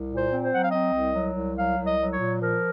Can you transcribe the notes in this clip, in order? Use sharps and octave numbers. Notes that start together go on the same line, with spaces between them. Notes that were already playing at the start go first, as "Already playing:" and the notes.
Already playing: C2
A#2
C5
C4
C5
F#3 F#5
F5
C4 D#5
C2
F#3
C2
F#3 F5
C2
D#5
F#3
C#5
A#2
F3 A#4